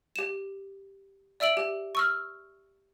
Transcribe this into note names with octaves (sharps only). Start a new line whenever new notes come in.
G4 E7
D5 E5 E6 D7 F#7
G4
C#6 E6 F6